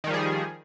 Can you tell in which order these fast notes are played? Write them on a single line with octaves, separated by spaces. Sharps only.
D#3 G3 F3 G#4